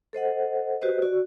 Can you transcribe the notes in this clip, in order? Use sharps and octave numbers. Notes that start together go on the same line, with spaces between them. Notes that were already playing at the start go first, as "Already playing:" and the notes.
A4 C5 D#5 F#5
F#4 G4 B4 C5 D#5
F#4 D5